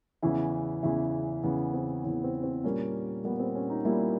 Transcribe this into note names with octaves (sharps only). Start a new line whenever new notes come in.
E2 C#3 E3 E4
E2 C#3 E3 E4
E2 C#3 E3 B3
C4
E2 C#3 E3 C#4
C4
C4
A#2 G3 A#3 C#4
A#2 G3 A#3 B3
C4
C#4
D#4
A#2 G3 A#3 E4